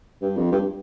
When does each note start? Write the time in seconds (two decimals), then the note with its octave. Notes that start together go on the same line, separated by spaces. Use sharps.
0.22 G2
0.37 F2
0.52 G2